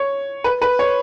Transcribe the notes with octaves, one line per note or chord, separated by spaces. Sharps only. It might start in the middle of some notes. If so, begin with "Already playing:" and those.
Already playing: C#5
B4
B4
C#5